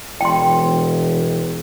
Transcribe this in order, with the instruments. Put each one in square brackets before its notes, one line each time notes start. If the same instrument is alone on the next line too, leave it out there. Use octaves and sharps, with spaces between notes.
[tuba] E1 [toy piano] G5 C6